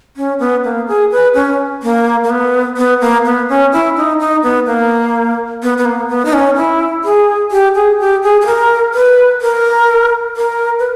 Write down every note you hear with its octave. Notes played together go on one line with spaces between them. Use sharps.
C#4
B3
A#3
G#4
B4
C#4
A#3
A#3
B3
B3
A#3
B3
C#4
E4
D#4
D#4
B3
A#3
B3
B3
A#3
B3
D#4
C#4
E4
G#4
G4
G#4
G4
G#4
G#4
A#4
B4
A#4
A#4
B4